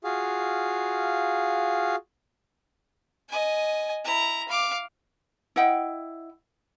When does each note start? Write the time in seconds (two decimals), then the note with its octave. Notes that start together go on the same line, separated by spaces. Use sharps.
0.04 F4 F#4 G#4 F5
3.29 D#5 G#5
4.04 E4 A#5
4.48 F5 D6
5.56 E4 D#5 F#5 G5